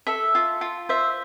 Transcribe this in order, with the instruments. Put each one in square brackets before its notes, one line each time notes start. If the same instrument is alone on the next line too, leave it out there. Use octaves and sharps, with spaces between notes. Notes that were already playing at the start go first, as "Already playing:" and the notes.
[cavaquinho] A4 E5
F4
F4
C5 E5